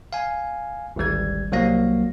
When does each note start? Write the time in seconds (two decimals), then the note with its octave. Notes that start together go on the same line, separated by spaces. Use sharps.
0.13 F5 G#5
0.96 G#1 D2 G3 G#6
1.52 C2 F#3 A#3 F#4 F5 A#6